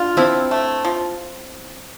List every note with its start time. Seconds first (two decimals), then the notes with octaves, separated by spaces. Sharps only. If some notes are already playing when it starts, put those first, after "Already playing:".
Already playing: D4 F4
0.17 F3 C4 E4
0.51 A3
0.85 F3